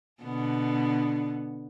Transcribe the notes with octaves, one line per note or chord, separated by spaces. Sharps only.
B2 D3 B3